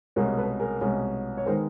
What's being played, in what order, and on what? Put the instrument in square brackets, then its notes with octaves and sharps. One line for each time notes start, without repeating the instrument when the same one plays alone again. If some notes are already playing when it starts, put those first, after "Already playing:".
[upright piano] C2 B2 G#3 C#4 G#4 A#4
A4 B4
G#4 A#4
C2 B2 G#3 C#4
C#5
D#3 G#3 B3 A#4 C5